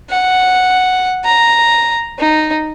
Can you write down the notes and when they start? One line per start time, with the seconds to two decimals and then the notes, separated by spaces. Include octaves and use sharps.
0.10 F#5
1.25 A#5
2.19 D#4